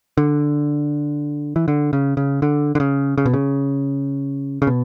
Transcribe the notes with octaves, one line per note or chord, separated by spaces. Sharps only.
D3
E3
D3
C#3
C#3
D3
D3
C#3
C#3
B2
C#3
C#3
B2